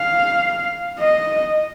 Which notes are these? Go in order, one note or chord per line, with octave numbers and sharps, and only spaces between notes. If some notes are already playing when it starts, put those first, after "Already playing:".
Already playing: F5
D#5